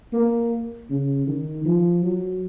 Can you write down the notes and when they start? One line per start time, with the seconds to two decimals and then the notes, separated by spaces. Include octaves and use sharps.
0.13 A#3
0.90 C#3
1.27 D#3
1.65 F3
2.02 F#3